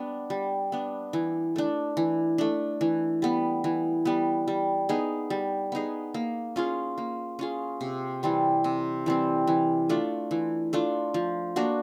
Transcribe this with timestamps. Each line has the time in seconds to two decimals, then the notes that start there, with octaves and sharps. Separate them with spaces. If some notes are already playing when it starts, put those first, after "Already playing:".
Already playing: G3 B3 D4
0.30 G3
0.72 B3 D4
1.13 E3
1.56 A3 D4
1.97 E3
2.38 A3 D4
2.81 E3
3.22 G3 B3
3.64 E3
4.05 G3 B3
4.48 G3
4.89 B3 D#4 G#4
5.30 G3
5.72 B3 D#4 G#4
6.14 A#3
6.56 C#4 F4 G#4
6.98 A#3
7.39 C#4 F4 G#4
7.81 C3
8.23 E3 G3 C4
8.64 C3
9.06 E3 G3 C4
9.47 E3
9.89 A3 D4 F4
10.31 E3
10.73 A3 D4 F4
11.14 F3
11.56 A#3 D4 F#4